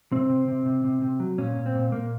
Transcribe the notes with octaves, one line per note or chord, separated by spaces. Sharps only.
C3 C4
C3
C3
C3
C3
C3
F#3
A#2 C#4
A#2
C4
A#2
A#2 A#3